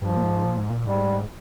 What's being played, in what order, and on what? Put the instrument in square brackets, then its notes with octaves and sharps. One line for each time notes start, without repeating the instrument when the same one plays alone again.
[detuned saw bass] G2 [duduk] F3
[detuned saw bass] A#2
G#2
A#2
G#2
A#2
[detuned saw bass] G#2 [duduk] G3